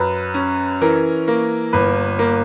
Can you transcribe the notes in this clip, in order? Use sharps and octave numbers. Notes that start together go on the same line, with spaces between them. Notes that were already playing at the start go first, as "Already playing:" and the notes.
Already playing: F#2 B4
C#4
E3 A#4
A#3
G1 B4
A#3